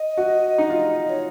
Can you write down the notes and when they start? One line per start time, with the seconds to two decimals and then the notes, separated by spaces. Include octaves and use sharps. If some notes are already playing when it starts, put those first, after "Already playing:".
Already playing: D#5
0.17 F#4
0.58 D#4
0.70 F4
1.09 C#5